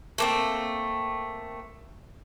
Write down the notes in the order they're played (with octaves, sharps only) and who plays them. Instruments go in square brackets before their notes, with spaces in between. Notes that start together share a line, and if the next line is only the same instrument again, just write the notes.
[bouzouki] A3 A#3 C4